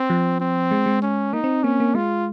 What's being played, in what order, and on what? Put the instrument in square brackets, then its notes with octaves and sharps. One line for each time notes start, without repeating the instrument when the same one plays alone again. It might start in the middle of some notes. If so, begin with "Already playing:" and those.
Already playing: [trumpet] C4
[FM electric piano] F3
[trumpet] C4
[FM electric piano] G#3
G#3
[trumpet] C#4
[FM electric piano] A#3 [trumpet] D#4
[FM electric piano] C4
[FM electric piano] A#3 [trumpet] C#4
[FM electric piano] A#3
[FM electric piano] G#3 [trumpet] F4